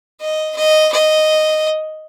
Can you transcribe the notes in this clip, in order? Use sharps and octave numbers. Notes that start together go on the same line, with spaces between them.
D#5
D#5
D#5